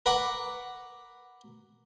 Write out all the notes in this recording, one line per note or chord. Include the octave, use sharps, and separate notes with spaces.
A#4 B4 F#5 B5 C#6 D6